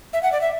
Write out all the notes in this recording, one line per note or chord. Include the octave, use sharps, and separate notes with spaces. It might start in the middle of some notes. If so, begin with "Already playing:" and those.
E5
F#5
D5
E5